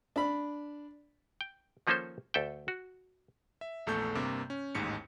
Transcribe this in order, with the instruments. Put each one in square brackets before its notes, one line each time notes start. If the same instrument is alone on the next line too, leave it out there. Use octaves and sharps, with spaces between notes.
[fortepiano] D4 B5
[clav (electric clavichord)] G5
D#3 F3 A#3 C#4 A4 C5
D2 A4 E5 G5
F#4
[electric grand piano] E5
A#1 E2 A3 A4 C#6 G6
G2 C3 A#3 D6
C#4
A1 D#2 G#2 C#7